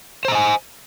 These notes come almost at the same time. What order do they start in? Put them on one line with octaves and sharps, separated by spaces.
C5 A#5 D#5 G#5